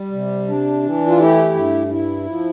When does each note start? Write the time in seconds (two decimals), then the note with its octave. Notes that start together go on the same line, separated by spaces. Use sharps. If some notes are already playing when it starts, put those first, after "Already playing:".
Already playing: G3
0.12 C3
0.48 D4
0.83 E3
1.07 F4
1.18 A3 E4 G4
1.54 G2
1.90 E4
2.25 F3